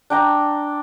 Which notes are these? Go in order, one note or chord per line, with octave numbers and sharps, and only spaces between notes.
D4 G5 A#5